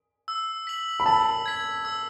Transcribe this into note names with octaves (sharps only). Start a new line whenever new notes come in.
E6
B6 F#7
B5
A5 E6
G#6 B6
E6